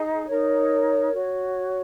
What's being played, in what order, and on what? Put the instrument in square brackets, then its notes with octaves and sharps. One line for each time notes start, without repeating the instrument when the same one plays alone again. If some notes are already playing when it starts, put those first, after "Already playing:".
Already playing: [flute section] D#4 G#4
D#4 A#4 C#5
F#4 C#5